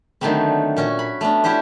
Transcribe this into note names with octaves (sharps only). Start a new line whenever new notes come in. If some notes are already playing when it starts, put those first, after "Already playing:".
D3 D#3 F#3 A3 B3 C4
A#2 C#4 F#4
B5
A3 B3 C#4 D4
C#4 E4 F#4 G4 C5